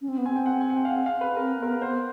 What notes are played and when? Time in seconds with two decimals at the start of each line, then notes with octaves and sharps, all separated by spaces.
0.01 C#4
0.09 C4
0.18 B3
0.26 C4 G#5
0.36 G5
0.46 F#5
0.61 G#5
0.70 F#5
0.76 G5
0.85 F5
0.91 F#5
1.06 F5
1.21 B4
1.36 C4 A#4
1.59 B3 A#4
1.72 B4
1.81 B3 C5